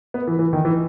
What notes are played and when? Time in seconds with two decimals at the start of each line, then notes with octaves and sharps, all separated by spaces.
0.14 B3
0.27 E3
0.39 E3
0.53 D#3
0.65 E3